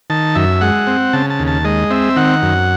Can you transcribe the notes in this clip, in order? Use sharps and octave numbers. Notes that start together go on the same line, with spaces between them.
D#3 A5
F#2 E5
G#3 F#5
C4
C#3 A5
A5
D#2
A5
G#3 D#5
C4 E5
D#3 F#5
F#2